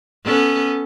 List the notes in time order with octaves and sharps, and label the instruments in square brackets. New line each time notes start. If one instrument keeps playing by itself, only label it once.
[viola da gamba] B3 C#4 A4